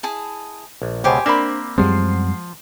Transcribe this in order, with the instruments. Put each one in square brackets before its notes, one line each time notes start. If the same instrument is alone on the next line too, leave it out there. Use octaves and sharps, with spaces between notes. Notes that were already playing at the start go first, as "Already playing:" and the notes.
[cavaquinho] E4 G#4 A5
[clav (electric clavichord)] A#1
[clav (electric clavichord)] C#2 B2 [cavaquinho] G4 C5 G#5
[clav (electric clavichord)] A#3 C4 E5 [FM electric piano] D4 A#4 C5 [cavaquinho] D5 B5
[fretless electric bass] F#2 G3 C4 [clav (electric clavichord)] F3 [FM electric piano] G#3 F#5 C7